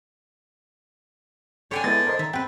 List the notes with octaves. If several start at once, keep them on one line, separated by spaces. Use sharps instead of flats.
D3 C#5 G5 G#5
G#3 B3 E4 A6
A#4 C5 D#5
D#3 E5 A#5
C4 B4 F#5 G5